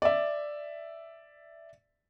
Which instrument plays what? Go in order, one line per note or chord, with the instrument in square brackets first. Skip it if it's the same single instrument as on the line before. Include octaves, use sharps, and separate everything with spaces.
[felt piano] D5 E5